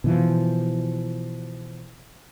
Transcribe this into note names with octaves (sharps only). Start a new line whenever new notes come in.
B2 E3 F3